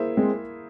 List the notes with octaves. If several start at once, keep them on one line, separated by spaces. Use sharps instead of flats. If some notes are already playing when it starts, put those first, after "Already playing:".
Already playing: A#3 E4 G#4 C5 E5
G#3 C4